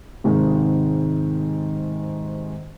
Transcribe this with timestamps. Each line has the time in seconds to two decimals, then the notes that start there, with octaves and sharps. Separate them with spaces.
0.24 G#2 C3 D#3 G#3